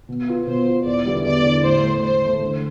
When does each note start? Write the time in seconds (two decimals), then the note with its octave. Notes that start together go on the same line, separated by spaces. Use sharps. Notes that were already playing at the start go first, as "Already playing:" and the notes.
0.09 B2
0.28 B3 F4
0.47 B2 C5
0.67 B3 F4
0.85 E2 D5
1.06 D3 G3 B3 E4
1.24 E2 D5
1.44 D3 G3 B3 E4
1.64 A2 C5
1.83 E3 A3
2.02 A2 C5
2.22 E3 A3
2.42 D3